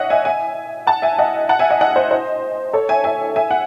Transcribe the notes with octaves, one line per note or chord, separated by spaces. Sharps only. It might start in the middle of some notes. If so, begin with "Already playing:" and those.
Already playing: C#5 D#5 E5 F#5
E5 G#5
E5 G#5
F#5 A5
E5 G#5
D#5 F#5
F#5 A5
E5 G#5
D#5 F#5
D#5 F#5
C5 D#5
C5 D#5
A4 C#5
E5 G#5
E5 G#5
E5 G#5
F#5